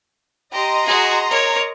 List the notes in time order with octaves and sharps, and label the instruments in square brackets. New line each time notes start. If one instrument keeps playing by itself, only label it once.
[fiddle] G4 [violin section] D#5 A#5 C6
[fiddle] F#4 G#4
A#4 C#5